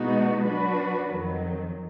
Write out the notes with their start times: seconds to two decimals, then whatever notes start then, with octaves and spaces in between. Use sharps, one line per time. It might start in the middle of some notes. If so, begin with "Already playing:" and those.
Already playing: B2 G#3 B3 D#4 F#4
0.42 F#3 D4 F#4 B4
1.05 F2 D#3 F#3